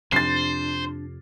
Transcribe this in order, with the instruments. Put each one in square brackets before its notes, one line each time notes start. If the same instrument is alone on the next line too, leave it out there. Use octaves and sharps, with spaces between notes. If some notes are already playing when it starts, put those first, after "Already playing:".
[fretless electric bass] F2 C3 [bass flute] D4 [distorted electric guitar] C5 [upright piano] A6 C7